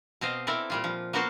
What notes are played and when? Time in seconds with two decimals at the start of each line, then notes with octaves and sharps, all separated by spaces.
0.21 B2 C4 C5 D#5 F5
0.47 C4 E4 A4 A#4 D5
0.70 A#2 G3 F4
0.84 F3
1.13 A#3 B3 F#4 A#4 C5 D5